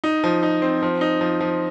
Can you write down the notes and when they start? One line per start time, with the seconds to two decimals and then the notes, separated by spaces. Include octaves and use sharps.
0.04 D#4
0.24 F3
0.43 D#4
0.62 C4
0.83 F3
1.01 D#4
1.21 F3
1.41 F3